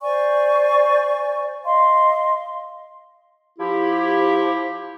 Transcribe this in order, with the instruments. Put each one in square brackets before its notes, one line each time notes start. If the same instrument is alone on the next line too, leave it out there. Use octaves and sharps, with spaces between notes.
[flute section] C5 D5 G#5 C#6
D#5 F5 C6
[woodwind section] F3 E4 G4